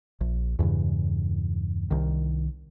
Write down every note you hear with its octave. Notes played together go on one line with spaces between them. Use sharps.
A#1
E2 G2 C#3 E3
C2 D#3